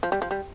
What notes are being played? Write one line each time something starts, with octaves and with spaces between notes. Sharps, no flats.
F3
G3
F3
G3